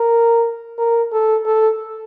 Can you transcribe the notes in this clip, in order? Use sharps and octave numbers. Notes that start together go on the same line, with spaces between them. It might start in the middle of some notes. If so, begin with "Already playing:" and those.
Already playing: A#4
A#4
A4
A4